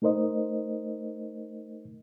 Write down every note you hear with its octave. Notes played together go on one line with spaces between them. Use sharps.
A3 D#4 A#4 C5 D#5